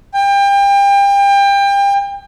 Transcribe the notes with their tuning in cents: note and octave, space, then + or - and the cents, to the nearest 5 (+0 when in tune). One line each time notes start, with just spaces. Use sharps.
G5 +30